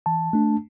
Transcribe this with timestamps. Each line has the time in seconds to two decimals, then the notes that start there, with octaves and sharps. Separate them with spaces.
0.06 E3 A5
0.33 A3 D4